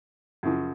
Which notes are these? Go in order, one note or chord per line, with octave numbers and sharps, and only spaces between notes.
F#2 C#3 F3